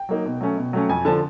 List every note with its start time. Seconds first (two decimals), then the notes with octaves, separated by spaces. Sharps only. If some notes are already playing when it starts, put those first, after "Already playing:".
Already playing: G5
0.09 F#3 A#3 D#4
0.25 B2
0.41 F#3 A3 C#4
0.57 B2
0.73 F#3 A3 C#4
0.89 F2 G#5
1.05 D3 F3 A5